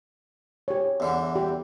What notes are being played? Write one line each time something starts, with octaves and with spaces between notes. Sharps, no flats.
G4 C#5
E2 D3 E3
G4